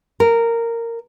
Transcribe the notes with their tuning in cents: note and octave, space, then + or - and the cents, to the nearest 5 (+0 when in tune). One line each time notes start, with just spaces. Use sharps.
A#4 -10